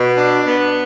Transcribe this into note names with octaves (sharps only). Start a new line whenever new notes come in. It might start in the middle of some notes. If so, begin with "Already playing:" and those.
Already playing: B2
D4
B3